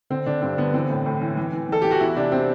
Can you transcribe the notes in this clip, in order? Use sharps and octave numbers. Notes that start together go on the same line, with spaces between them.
D3 C4
D3 D4
G2 C4
D3 B3
E3 C4
A2
A2
E3
E3
E3
E3 A4
E3 G4
F#4
E2 E4
C3 D4
C4